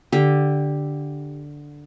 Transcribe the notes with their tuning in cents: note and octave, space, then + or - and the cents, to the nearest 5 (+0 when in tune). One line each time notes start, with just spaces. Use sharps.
D3 +0 G4 +0